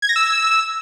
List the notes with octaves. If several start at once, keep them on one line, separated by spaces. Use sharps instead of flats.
G#6
A#6
E6